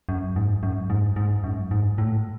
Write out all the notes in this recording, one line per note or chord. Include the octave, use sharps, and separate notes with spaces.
F#2
G#2
F#2
G#2
G#2
F#2
G#2
A2